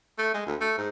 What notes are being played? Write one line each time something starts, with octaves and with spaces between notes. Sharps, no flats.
A3
G#3
D2
A3
G#2